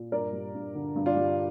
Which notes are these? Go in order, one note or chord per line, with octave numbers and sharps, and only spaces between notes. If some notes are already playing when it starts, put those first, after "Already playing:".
Already playing: A#2
G2 A#4 D5
G3
G2
D3
G2
D4 F4
G3